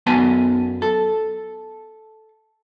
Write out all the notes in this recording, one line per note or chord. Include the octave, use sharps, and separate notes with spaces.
F#2 B3 G#5 A5
A4